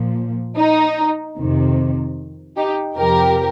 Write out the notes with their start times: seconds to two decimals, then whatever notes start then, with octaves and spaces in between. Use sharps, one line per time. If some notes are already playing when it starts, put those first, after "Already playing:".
Already playing: A#2 F3
0.56 D#4
1.37 F2 C3 D#3
2.57 D#4 G4
2.97 F2 C3 F3 G4 A#4